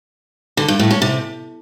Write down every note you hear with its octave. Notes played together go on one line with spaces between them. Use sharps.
D3
G2
A2
C#4
C3